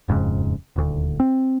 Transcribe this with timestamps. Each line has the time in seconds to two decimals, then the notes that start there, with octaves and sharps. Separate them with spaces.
0.08 D#1 F2 G#2 C#3
0.76 D#1 D2
1.20 C4